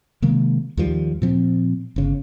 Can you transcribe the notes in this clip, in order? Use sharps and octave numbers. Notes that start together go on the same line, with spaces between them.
C3 D#3 G#3 A#3
D#2 D#3 F3 G3
A#2 F3 C4
G1 C#3